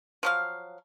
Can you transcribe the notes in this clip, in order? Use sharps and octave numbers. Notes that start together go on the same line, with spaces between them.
F3 F#3 F5